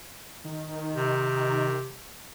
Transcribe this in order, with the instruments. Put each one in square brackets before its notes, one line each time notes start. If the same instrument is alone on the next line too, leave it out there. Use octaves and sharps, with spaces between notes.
[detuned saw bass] D#3
[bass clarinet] C3